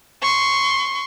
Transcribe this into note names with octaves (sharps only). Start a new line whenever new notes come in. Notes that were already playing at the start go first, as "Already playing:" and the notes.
C6 C#6